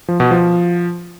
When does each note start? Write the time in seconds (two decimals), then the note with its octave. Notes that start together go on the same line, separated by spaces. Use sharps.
0.08 F3
0.20 B2
0.31 F3